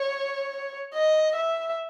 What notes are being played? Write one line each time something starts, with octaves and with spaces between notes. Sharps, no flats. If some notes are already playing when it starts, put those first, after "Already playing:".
Already playing: C#5
D#5
E5